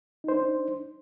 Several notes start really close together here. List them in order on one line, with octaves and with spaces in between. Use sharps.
D#4 C5 D4